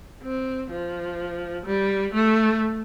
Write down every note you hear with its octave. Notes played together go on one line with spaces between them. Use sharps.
C4
F3
G3
A3